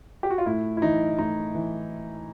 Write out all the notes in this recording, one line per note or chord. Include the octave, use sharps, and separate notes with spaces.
G4
F#4
F4
A2 E4
E4
E3 D#4
A2 D#4
E3